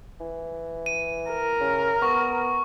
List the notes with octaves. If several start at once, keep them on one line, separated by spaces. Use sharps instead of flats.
E3
D#7
A#4
C#3
B3 C#6